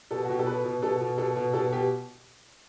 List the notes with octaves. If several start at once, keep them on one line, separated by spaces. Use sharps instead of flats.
B2 A4
F#4
B2 G4
A4
B2 B4
B2
B2 A4
B2
B2 A4
B2
B2 A4
B2 G4